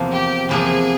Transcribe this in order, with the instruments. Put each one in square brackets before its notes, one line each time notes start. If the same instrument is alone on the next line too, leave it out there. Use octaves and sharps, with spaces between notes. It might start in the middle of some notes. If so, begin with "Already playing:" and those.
Already playing: [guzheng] E2 C3 F3 A#3
[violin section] G4
[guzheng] E2 C3 F3 A#3 [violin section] G#4